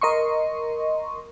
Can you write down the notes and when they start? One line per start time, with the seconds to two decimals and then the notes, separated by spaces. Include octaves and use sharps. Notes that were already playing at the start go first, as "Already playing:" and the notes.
0.01 A#4 D#5 C6 C#6